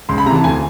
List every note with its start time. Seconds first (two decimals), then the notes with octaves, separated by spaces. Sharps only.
0.09 C#2 C6
0.18 B5
0.26 C3 A#5
0.31 E3 A5
0.44 D2 G#5